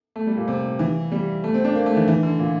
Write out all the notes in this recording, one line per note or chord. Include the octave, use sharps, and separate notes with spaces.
A3
G3
A#2
C3
E3
G3
A3
C4
D4
A#3
A3
E3
E3
D3
A#2